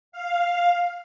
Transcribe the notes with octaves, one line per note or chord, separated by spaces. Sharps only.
F5